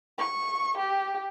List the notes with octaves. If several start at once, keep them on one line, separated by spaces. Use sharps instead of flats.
C#6
G4